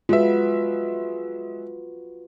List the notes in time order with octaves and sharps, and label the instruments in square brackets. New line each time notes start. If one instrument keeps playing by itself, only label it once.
[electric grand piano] G#3 E5 [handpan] F4 F#4 B4